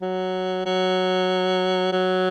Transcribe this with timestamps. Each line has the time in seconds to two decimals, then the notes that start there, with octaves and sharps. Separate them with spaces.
0.01 F#3
0.66 F#3
1.92 F#3